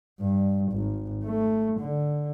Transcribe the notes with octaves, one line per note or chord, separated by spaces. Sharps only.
G2
G#1
A3
D3